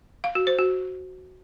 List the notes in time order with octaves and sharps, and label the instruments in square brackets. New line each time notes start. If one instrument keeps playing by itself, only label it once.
[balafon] F5
F#4
C5
F#4